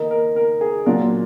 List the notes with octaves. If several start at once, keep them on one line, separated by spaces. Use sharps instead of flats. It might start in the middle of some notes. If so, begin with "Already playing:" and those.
Already playing: D#3 A#3 D#4
A#4
A#4
G#4
A#2 F#3 D4 F4 A#4